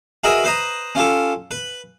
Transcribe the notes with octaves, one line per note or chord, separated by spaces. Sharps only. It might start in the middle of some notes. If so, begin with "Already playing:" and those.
F#4 G#4 A#4 B4 D#5 E5
B4 C5 D#5 A#5
C#4 F4 G4 A4
B4